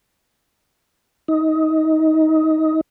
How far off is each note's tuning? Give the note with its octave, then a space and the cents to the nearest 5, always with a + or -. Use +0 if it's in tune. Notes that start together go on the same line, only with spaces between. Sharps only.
D#4 +20